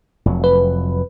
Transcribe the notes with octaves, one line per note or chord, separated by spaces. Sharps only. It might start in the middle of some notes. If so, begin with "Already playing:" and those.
F1 F2 F#3
B4